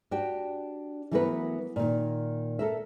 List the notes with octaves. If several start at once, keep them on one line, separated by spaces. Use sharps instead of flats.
D4 F#4 G4 G5
E3 F#3 A3 B3 A#4 B4
A#2 D#3
A4 A#4 E5